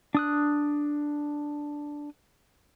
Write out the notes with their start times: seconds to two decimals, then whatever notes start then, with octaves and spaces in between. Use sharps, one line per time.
0.15 D4 D#6 F#6